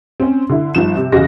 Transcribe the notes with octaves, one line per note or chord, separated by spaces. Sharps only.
C4 C#4
D3 E4
G1 D#3 F3 E7
C3
E2 C#3 F#4 D#5 A#6